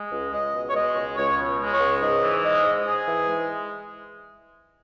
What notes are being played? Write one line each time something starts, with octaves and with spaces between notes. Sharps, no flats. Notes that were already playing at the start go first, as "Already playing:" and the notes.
Already playing: G#3
C#2
C#2 D#5
B2
C#5
G#3 D#5
C#2
C#2 C#5
B2
G#3
C#5
C#2
G#2 D#5
E3
G#3 D#5
G#2
G#2 G#4
E3
G#3